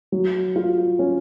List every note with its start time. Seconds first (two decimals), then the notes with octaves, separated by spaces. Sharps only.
0.12 F#3
0.56 F4
0.99 C#4